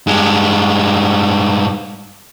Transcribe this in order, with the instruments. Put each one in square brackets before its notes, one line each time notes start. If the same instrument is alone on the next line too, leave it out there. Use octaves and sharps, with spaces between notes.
[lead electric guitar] G2 G#3